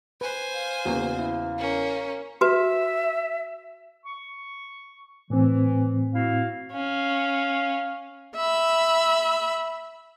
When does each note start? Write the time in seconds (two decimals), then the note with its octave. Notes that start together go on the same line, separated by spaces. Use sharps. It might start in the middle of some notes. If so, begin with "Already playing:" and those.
0.21 B4 C5 G#5
0.55 F5
0.85 E2 C#3 A#3 B3 F#4
1.19 E4
1.58 A#3 C#4
2.41 F#4 B4 E5
4.05 C#6
5.30 A2 E3 C4
6.14 E4 F#4 F5
6.72 C#4 F5
8.36 E5 B5